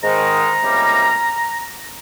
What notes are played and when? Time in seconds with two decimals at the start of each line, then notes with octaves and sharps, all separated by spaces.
0.03 G#2 D#3 G#3 A#5
0.62 C#2 C3 G3 A#3 C#4